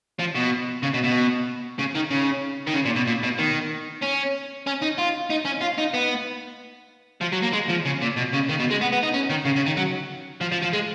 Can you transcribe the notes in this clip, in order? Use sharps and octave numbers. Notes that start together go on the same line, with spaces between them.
F3
B2
C#3
B2
B2
C#3
D#3
C#3
D#3
C#3
A#2
B2
A#2
B2
D#3
C#4
C#4
D#4
F4
D#4
C#4
F4
D#4
B3
F3
F#3
A#3
G#3
F3
C#3
A#2
B2
C#3
D#3
B2
G#3
B3
B3
D#4
C#4
D#3
C#3
C#3
D#3
F#3
F3
F3
F3
G#3